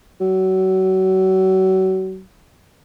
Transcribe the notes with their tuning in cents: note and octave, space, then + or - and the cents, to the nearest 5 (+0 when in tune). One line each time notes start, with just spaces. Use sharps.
F#3 +30